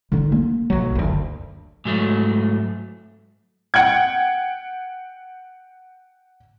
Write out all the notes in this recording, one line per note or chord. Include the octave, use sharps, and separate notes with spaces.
D3 D#4
A#3
B1 F#3
F#1 D2
G#2 F#3 A3
F#5 G5 G#6